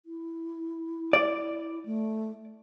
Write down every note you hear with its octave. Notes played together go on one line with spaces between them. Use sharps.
E4
D5
A3